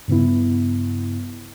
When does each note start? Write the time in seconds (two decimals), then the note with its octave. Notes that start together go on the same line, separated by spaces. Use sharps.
0.08 G2 C#3 B3 E4